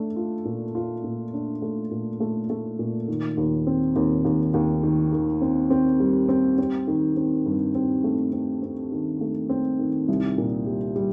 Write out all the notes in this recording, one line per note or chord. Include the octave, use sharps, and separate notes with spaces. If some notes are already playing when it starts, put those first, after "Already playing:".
Already playing: A3 D4
F4
A#2
F4
A#2
D4
A3
A#2
A3
A3
A#2
D#3
D#2
C4
D#2
D#2
D#2
D#3
D#3
C4
C4
G3
C4
C4
D#3
C4
G2
C4
A3
C4
C4
D#3
A3
C4
D#3
C2
A#2
G3
G3